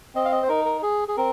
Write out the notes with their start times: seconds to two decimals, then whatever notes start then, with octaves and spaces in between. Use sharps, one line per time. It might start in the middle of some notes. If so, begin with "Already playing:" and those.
0.15 C4 D#5
0.25 F5
0.32 D#5
0.43 C5
0.49 D#4 A#4
0.65 A#4
0.82 G#4
1.08 G#4
1.17 C4 A#4